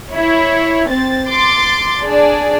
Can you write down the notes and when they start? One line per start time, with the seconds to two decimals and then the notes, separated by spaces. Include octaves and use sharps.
0.11 E4 C#5
0.88 C4 A6
1.29 C6 D6 A6
2.03 D4 G#4 D5